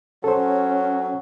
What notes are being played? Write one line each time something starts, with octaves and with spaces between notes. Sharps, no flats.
F#3 C#4 A4 C5